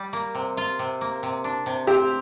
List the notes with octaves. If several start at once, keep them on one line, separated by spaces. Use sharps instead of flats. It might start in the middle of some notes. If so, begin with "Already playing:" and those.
Already playing: G3
A#3
C3
F4
C3
A#3
C3
D4
C3
C4 G4